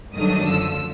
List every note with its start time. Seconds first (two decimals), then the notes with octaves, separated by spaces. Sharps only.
0.14 G2 D#3 F#3 A3 D4 D#6
0.45 F#2 D3 F3 E6